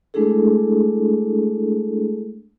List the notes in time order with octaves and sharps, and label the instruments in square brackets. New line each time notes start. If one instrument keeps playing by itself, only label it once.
[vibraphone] G#3 A3 D4 E4 G#4 A4